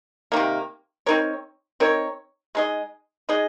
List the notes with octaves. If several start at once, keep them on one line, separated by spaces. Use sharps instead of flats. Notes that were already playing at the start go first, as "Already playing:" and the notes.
C3 D#3 A#3
C4 D#4 A#4 C#5
C4 D#4 A#4 C#5
G#3 D#4 G#4 D#5
G#3 D#4 G#4 D#5